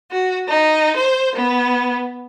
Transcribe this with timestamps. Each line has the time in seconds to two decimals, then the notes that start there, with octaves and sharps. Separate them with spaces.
0.11 F#4
0.47 D#4
0.96 C5
1.35 B3